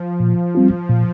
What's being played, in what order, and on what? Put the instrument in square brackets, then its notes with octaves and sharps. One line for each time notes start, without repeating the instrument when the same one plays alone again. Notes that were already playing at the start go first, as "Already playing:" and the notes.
Already playing: [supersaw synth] F3
[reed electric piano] A#2
G3 C4 F4
A#2